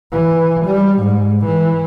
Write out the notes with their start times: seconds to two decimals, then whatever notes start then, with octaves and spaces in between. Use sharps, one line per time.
0.13 E3
0.66 G3
1.00 G#2
1.45 E3